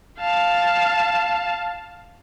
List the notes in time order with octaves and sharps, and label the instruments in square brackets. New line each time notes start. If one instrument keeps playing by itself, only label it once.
[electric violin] F5 A5